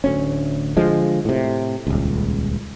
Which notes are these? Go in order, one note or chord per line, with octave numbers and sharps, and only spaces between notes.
D1 D2 C#4
D3 F3 G#3
A2 C3
D#1 C#2